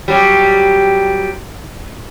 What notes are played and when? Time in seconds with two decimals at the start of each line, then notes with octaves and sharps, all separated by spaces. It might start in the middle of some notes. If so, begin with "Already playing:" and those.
0.08 F#3 G3